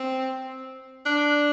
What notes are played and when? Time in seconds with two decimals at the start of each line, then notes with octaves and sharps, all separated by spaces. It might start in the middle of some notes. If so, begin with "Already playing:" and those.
Already playing: C4
1.05 D4